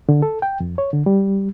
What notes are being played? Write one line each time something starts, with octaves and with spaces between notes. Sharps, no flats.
D3
A4
G5
F2
C#5
D3
G3